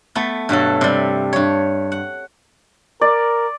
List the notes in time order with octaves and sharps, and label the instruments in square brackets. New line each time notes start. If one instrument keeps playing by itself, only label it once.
[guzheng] A3 B3
G2 B2 F#3 A4
C3 G3
G2 C#5
F#5
[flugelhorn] A#4 [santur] D5